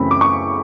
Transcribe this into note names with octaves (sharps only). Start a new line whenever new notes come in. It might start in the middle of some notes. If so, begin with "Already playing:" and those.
Already playing: F#2 C#3 E3 A3 C4 B5
D6
C#6